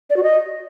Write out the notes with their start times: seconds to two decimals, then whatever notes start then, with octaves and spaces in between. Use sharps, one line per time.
0.10 D5
0.16 F#4
0.23 D#5